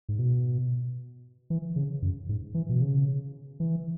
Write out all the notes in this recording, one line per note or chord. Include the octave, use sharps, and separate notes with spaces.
G#2
B2
E3
C#3
F#2
G#2
E3
B2
C#3
E3